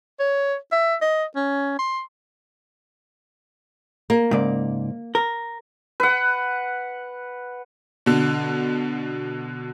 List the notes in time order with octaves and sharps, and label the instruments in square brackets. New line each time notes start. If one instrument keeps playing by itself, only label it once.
[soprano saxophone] C#5
E5
D#5
C#4
C6
[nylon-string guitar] A#3
[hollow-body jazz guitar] G#2 C#3 D5
A#4
[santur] B4 F#5
[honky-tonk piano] B2 D3